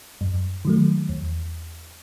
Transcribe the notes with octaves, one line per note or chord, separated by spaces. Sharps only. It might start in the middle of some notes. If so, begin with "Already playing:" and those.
F#2
D#3 F#3 A3
E2